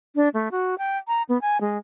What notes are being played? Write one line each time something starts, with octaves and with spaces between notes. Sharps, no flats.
D4
A3
F#4
G5
A#5
B3
G#5
G#3